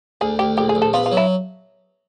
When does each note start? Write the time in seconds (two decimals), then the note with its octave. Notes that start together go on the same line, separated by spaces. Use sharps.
0.21 D2 G#4
0.39 D2 G4
0.57 A#1 G4
0.69 G#4
0.75 A#1
0.82 A4
0.93 B3 F4
1.06 F4
1.12 F#3
1.17 E4